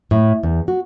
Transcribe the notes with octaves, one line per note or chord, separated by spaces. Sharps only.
A2
E2
F#4